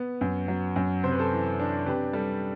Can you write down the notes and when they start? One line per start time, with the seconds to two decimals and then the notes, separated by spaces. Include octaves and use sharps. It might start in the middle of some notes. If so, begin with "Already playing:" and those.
Already playing: B3
0.21 F#2
0.48 F#3
0.76 F#2
1.04 C3 C5
1.12 B4
1.19 A4 C5
1.31 E3
1.59 D4
1.86 C3 G4 B4
2.13 G3 A4